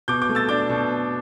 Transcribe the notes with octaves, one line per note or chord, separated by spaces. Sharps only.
B2 D6 G6
D6 G6
A3
E6 A6
D4 D6 G6
B2